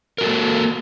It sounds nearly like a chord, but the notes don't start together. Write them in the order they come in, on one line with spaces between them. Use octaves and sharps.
A#4 F#4 A4 A#3